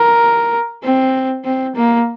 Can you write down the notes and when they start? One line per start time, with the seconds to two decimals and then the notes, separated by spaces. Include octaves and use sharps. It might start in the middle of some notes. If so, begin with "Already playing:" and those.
Already playing: A#4
0.84 C4
1.45 C4
1.76 A#3